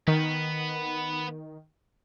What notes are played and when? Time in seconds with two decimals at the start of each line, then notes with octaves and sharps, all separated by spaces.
0.08 D#3 B3